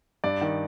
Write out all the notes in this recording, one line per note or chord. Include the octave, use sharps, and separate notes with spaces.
G2 D5
D#3